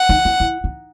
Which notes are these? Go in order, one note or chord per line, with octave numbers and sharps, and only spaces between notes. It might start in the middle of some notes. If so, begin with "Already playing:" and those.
Already playing: F#5
D#4
E4
E4
D#4